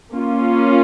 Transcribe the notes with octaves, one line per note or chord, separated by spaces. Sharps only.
A#3 C#4 F4